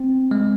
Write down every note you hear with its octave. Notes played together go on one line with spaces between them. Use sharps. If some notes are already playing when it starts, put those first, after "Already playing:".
Already playing: C4
G#3